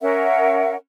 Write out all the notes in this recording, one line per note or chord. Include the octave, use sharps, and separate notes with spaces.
C#4 A#4 E5 F#5